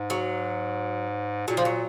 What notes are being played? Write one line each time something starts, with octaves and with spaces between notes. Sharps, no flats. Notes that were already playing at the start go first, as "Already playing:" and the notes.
Already playing: G#2
F#3
A#2 F#3
F3
F#3